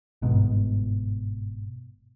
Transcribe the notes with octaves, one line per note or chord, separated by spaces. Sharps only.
G1 G#2 B2